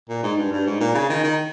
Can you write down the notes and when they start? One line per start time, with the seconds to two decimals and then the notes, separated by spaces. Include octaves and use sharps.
0.09 A#2
0.23 G#2
0.38 G2
0.52 G2
0.66 G#2
0.81 A#2
0.95 C#3
1.09 D#3
1.23 D#3